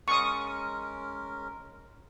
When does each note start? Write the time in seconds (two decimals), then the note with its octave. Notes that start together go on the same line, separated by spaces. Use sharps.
0.08 G#3 C#4 A#4 C#6 D#6